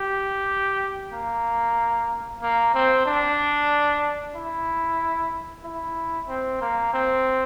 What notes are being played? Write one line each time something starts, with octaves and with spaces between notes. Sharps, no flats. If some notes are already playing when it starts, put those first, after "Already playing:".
Already playing: G4
A#3
A#3
C4
D4
E4
E4
C4
A#3
C4